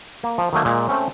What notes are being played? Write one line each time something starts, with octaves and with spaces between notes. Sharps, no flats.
A#3
F3
D#3 F#3 A3 A#3
A#2 G#3
A3 C4 C#4